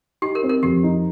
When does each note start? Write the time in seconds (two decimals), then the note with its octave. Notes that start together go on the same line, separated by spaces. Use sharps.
0.22 D#4 G4
0.35 A#4
0.43 C4
0.50 A#4
0.63 F2 G4
0.83 D#4